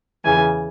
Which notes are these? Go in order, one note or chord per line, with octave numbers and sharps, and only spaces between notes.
E2 C#3 E3 G#5